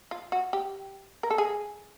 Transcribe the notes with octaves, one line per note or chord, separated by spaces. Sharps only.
F4
F#4
G4
A#4
A4
G#4